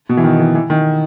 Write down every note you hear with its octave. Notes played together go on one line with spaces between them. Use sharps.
B2
E3
D#3
E3
E3
D#3